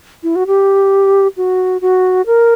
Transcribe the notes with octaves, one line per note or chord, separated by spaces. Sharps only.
E4
F#4
G4
F#4
F#4
A#4